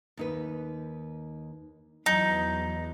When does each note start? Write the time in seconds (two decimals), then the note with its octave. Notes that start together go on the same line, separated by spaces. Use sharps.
0.17 D#2 D#4 B4
2.06 E2 F#3 D#4